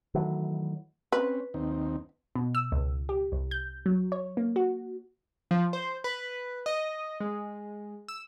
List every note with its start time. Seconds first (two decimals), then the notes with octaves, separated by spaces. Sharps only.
0.15 D#3 E3 F#3 A3
1.12 C4 C#4 B4
1.54 D#2 C4 D#4
2.35 B2
2.55 E6
2.72 C#2
3.09 G4
3.32 C2
3.51 G6
3.86 F#3
4.12 C#5
4.37 A#3
4.56 F#4
5.51 F3
5.73 C5
6.04 B4
6.66 D#5
7.20 G#3
8.08 E6